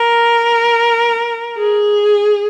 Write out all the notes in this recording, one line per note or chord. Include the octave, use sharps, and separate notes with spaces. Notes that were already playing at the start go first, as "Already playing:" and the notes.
Already playing: A#4
G#4